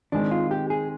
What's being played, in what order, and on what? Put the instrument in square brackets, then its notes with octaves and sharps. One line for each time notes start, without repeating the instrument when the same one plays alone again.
[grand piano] D#3 G#3 C4 [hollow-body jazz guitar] D4
[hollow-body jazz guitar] F4
G4
G#4